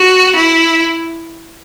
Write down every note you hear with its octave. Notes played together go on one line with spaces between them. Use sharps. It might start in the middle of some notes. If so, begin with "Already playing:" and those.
Already playing: F#4
E4